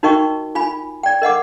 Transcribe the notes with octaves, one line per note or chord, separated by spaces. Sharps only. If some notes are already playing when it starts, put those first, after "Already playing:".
D#4 F#4 A#4 D#5 G5 C#6
F4 G#5 B5
D5 G5
A#4 D#5 F#5 D6